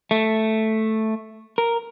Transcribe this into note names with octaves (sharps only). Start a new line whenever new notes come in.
A3
A#4